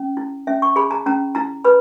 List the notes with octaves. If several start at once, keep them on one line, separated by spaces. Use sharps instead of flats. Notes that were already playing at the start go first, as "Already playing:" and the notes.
Already playing: C#4
E4
C#4 E5
C#6
G#4 B5
A#5
C#4 A#5
E4 A#5
B4 B5